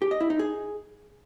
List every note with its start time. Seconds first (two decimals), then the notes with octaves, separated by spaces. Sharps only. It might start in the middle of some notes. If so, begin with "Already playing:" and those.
0.02 G4
0.11 D#5
0.21 E4
0.30 D#4
0.39 G#4